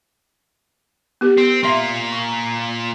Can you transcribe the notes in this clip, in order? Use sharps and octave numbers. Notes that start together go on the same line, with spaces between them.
B3 G4 A#4
C4
A#2 A#3 E5 C6
C#6